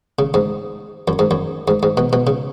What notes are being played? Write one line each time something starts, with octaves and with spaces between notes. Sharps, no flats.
C#3
G#2
F#2
G#2
F#2
G#2
G#2
B2
B2
C#3